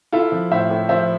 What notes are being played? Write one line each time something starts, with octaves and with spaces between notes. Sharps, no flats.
E4 F4 A4
F3
A2 C5 E5
A2
F3 C5 E5